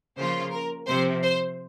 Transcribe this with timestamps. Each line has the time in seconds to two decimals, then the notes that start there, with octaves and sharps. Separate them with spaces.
0.16 C#3 F3 A#3 F4 C5
0.52 A#4
0.87 C3 F3 C4 C5
1.23 C5